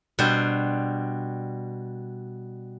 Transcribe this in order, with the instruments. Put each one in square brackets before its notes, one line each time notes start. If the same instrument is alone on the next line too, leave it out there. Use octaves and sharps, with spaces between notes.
[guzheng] B2 G3 D4 C5